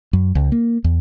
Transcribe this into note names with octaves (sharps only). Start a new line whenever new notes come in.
F#2
C#2
A#3
E2